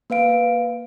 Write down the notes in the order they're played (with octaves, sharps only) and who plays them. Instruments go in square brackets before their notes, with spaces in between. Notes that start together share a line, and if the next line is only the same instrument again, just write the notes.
[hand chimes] A#3 B4 F5 D7